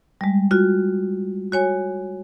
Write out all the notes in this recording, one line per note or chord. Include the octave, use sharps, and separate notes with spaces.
G3 G#3
F4 F#4
F#4 C#5 G#5